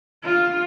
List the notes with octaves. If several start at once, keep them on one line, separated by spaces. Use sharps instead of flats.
F4